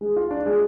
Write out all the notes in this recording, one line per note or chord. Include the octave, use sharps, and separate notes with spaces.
G#3
F4
D4
G#3